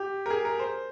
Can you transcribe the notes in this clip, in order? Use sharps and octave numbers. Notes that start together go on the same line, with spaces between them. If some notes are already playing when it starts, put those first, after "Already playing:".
Already playing: G4
A#4
G#4
A#4
C5